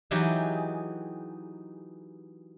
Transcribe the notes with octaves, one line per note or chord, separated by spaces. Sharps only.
E3 F#3 D#4 E4 G4 G#4